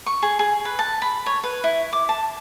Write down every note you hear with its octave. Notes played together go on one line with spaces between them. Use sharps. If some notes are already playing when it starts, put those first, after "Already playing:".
C#6
G#4
G#4
B4
A5
B5
C#5
B4
E4
D6
A5